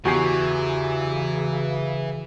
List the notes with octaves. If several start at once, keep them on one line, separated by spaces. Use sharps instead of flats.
E2 C#3 E3 F#4 G4 G#5 C7